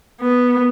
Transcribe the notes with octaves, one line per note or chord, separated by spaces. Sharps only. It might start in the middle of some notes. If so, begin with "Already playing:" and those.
B3